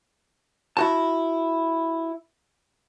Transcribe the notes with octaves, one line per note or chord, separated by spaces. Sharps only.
E4 F#4 A5